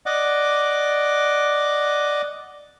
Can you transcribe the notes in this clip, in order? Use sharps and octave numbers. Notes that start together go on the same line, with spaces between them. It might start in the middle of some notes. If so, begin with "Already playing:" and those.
D5 D#5 F#5 D6